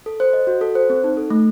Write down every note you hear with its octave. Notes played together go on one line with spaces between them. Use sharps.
A4
C5
D#5
F#4
A4
C5
C4
D#4
A4
A3